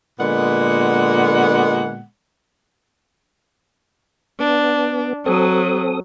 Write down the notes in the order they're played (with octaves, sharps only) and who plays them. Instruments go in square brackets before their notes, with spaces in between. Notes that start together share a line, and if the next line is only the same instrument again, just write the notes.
[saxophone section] A#2 D3 G#3 B3 F#5
[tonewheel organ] B3 [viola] D4
[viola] F#3 [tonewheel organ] C4 A4 D#6